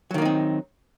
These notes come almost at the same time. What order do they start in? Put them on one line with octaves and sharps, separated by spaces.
F#3 D#3 A#3 D#4 C4